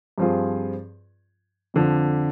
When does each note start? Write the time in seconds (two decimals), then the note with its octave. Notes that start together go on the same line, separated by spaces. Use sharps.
0.18 G2 F3 C4 F4 G#4
1.74 F2 D3 F3